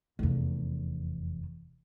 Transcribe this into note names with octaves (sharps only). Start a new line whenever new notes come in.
F1 E2